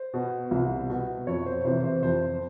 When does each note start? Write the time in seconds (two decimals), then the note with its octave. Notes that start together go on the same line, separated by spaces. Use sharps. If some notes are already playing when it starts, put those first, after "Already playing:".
Already playing: C5
0.14 B2
0.51 C2
0.90 B2
1.27 F2 C#5
1.46 C5
1.65 C3 E3 C5
1.84 C5
2.03 F2 C5